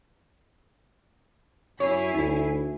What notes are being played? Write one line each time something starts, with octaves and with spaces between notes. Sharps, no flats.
F#2 E4 C#5 G#5 C7
D2 D#4